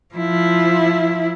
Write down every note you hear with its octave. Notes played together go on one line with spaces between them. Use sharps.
F3 E4